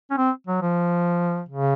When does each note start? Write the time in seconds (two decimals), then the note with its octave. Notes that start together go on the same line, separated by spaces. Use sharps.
0.10 C#4
0.17 C4
0.47 F#3
0.61 F3
1.49 C#3